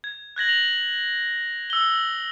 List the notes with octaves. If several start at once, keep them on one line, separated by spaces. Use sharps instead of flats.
G#6
F#6 G#6 A#6 F#7
F7 F#7
E6 G7